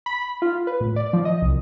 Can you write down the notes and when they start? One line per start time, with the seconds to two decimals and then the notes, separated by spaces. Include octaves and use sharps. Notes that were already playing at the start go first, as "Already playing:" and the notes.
0.06 B5
0.42 F4
0.67 B4
0.81 A2
0.96 D5
1.13 F3
1.25 D#5
1.42 C2